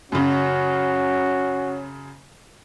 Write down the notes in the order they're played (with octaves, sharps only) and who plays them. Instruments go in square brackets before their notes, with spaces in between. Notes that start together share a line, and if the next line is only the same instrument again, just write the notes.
[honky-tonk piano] F#2 C#3 [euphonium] C#4 [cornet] F#4